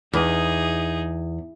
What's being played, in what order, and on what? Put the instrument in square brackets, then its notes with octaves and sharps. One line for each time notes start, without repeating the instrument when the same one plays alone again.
[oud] E2 [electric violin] D#4 G#4